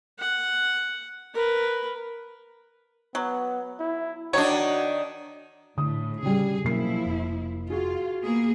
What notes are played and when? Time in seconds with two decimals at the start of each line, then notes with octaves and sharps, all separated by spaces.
0.19 F#5
1.34 A#4 B4
3.15 F#3 B3
3.79 E4
4.33 D#3 D4 F#4 C#5
5.78 A2 D3 D#6
6.23 C#3 G3 G#4
6.65 B2 F3 F#3 A#3 C#4 E4 C7
7.06 F1
7.70 F4 F#4 G#4
8.21 A#3 B3 G#4